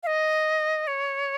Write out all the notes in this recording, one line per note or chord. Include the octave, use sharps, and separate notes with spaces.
F5
D#5
C#5